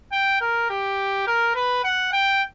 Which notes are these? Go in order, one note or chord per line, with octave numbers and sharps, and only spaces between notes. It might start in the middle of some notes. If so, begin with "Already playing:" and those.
G5
A#4
G4
A#4
B4
F#5
G5